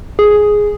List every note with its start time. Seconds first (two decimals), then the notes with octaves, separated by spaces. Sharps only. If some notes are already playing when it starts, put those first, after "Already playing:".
0.19 G#4